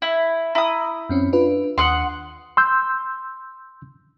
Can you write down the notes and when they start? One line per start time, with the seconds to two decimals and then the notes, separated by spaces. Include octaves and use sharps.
0.02 E4
0.55 E4 A#5 D#6
1.09 F#2 C4 C#4
1.33 D4 F4 B4
1.78 D#2 F#5 C6 D#6 C#7
2.57 C6 E6 G6